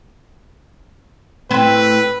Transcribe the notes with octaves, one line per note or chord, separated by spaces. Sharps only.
A2 C4 B4